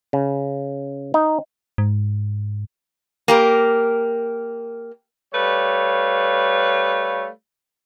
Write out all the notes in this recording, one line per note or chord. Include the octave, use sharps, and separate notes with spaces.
C#3
D#4
G#2
A#3 G4 A#4
G3 A3 B4 C#5 F5